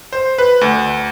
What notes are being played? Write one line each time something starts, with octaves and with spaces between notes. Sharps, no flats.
C5
B4
D2